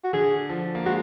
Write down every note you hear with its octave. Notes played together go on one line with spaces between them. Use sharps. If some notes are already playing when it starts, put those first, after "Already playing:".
F#4
D3 G#4
F3
A#3
G#3 F#4